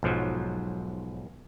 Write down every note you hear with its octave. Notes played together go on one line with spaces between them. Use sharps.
B1 G#2 F3 F#3